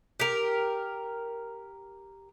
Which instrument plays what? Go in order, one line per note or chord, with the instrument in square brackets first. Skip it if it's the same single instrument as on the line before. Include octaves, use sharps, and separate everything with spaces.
[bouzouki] G4 A#4